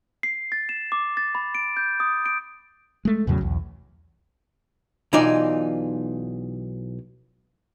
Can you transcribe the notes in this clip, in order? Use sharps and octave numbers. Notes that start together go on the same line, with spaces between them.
C7
A6
E7
D6
A6
B5
D7
G6
D#6
D7
G#3 A3
E2 A2 C#3 F#3
B1 E2
B1 E3 D#4 F4 D5 G#5